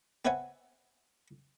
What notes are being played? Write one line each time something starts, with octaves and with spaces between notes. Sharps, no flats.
C4 B4 C#5 E5 F#5 G#5